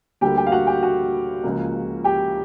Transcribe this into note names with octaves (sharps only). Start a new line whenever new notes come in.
D2 D3 G3 A#3 G4 G5
G4 G5
F5
F#4 F#5
G4 G5
F#4 F#5
C#2 C#3 F3 A#3
G4 G5